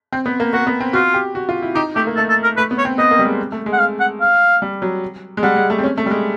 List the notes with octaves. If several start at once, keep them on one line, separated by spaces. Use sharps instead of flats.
C4
B3
A#3
A#3 F#4
B3
C4
F4 F#4
G4
F#4
F4
E4
D#4 G4
A3 G4
A#3
A3 A4
A4
A#4
A3 B4
B3
C#5
C4
B3 D#5
A#3
G3
G#3
A3
G#3
F#5
F5
F#5
F5
G3
F#3
G#3
G3 F#5
G#3
A3
C4
C#4
A3
G3
G#3